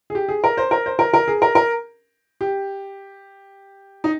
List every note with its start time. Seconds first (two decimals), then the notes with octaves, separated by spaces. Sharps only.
0.10 G#4
0.15 G4
0.29 G#4
0.44 A#4
0.57 C5
0.71 A#4
0.86 C5
0.99 A#4
1.14 A#4
1.28 G#4
1.42 A#4
1.55 A#4
2.41 G4
4.04 D#4